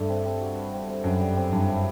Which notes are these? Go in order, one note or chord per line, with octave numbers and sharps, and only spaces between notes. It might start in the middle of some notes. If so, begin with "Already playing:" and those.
Already playing: G2 A3 D4 A4 E5
C4
C4
F#4
B4
C4
C4
F#2 B4
G3
C4
G2 E4
B4